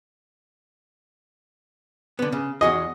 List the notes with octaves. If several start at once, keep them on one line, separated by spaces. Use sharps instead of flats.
D3 B3
C#3
E2 F#4 G#4 D#5